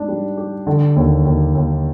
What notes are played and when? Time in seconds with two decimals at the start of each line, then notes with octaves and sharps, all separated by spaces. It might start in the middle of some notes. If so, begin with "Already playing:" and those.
Already playing: G#2 D4
0.08 G3
0.37 G4
0.67 D3
0.96 D#2
1.25 D#2
1.55 D#2